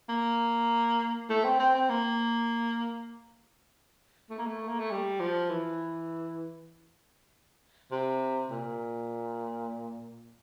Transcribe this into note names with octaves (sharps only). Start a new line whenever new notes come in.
A#3
A3
C4
C4
C4
A#3
A3
A#3
A3
A#3
A3
G3
F3
E3
C3
A#2